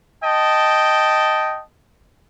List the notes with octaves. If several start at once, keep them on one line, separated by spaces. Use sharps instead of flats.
D#5 G5 A5